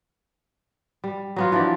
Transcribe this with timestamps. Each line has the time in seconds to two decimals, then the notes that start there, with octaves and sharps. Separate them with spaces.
1.04 G3
1.36 F#3 B3 F4
1.52 E3 F3 D4 D5